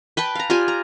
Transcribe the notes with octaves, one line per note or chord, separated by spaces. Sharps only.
B4 G5 A5
F5 A#5
F4 G4 D5 G#5
A#5